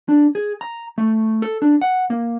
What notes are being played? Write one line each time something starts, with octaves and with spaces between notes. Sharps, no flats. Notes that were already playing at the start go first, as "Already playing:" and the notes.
D4
G#4
A#5
A3
A4
D4
F#5
A#3